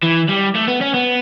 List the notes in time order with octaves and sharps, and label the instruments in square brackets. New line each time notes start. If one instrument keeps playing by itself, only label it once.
[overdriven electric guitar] E3
G3
A3
B3
C#4
B3